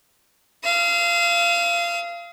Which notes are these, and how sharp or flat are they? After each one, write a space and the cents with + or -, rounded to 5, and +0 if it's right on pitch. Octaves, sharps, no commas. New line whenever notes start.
F5 -20 D#6 +45